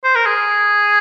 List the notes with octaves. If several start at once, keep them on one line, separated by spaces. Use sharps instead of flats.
C5
A#4
G#4